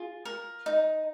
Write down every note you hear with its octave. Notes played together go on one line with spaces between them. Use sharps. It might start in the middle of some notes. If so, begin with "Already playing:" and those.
Already playing: F4 G#4
A#4
D#4